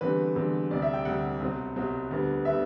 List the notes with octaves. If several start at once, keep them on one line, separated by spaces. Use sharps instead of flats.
E2 D3 G3 C4 B4
E2 D3 G3 C4
D2 C3 G3 D5
E5
G5
D2 C3 G3 F#5
C2 B2 F#3 C4
C2 B2 F#3 C4
D2 D3 G3 B3
D3 G3 B3 E5